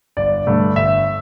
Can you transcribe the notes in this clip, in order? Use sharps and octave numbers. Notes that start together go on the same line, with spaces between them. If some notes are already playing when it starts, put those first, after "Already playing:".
G1 D5
G2 D3 A3
G1 E5